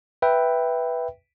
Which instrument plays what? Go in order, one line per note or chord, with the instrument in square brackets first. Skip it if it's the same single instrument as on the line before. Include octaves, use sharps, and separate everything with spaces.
[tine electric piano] B4 E5 G5